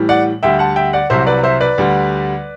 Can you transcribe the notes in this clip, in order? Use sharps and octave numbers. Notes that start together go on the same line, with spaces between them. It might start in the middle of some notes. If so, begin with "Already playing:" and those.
Already playing: A2 E3 G3
D5 F#5
D2 D3 G3 E5 G5
F#5 A5
E5 G5
D5 F#5
C2 C3 F#3 C5 E5
B4 D5
C5 E5
B4 D5
D2 D3 G3